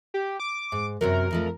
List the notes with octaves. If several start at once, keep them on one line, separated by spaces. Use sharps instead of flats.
G4
D6
G#2
F#2 C3 F#3 A#4
F2 F3 A3